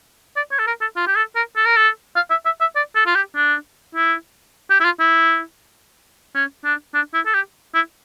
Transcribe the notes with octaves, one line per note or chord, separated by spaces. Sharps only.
D5
C#5
A4
A#4
A4
F4
G4
A4
A#4
A4
A#4
A4
F5
E5
E5
E5
D5
A4
F4
G4
D4
E4
G4
E4
F4
E4
C#4
D4
D4
E4
A4
G4
E4